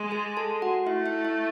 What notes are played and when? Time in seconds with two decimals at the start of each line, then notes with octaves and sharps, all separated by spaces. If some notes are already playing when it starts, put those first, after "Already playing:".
Already playing: G#3
0.11 G#4 G#5
0.37 A4 A5
0.62 F#4 F#5
0.87 A3 E4 E5
1.06 E4 E5
1.25 E4 E5